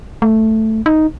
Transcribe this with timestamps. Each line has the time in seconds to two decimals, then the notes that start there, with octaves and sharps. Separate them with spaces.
0.22 A3
0.86 D#4